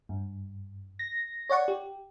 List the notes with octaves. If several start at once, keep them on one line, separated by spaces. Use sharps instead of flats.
G2
A#6
C#5 D5 F#5 C#6
G4